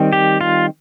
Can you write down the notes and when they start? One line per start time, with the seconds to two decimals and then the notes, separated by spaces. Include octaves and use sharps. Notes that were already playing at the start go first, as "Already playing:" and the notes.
Already playing: D#3 G3 C4
0.13 G4
0.41 F4